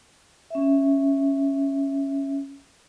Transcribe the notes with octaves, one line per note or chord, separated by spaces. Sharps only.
C#4 E5